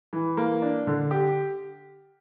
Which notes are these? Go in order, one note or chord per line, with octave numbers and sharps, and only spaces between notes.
E3
A#3
D4
D3
G4